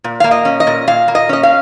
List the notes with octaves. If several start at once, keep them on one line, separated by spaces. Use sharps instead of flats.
A#2
A#3 F5
D#5
C#4
D#5
A#2
A#2 F5
A#3
D#5
C#4 D#5
F5